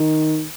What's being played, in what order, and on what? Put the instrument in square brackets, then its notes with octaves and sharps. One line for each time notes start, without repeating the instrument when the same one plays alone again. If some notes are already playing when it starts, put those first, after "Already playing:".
Already playing: [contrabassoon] D#3